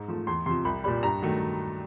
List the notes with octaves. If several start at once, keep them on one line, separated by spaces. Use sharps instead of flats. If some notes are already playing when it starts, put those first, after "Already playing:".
Already playing: G#2
F3 A3
E2 C6
C3 F3 C6
C2 B5
A#2 G3 B5
G2 A#5
D#3 F#3 A3